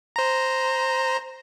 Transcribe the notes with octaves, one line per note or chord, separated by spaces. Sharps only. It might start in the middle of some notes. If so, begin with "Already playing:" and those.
C5 A#5